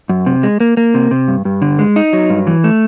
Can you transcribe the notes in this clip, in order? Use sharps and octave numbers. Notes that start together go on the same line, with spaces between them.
F#2
C3
G#3
A#3
A#3
C3
C3
G2
G2
D3
G#3
D#4
F#3
G2
E3
A3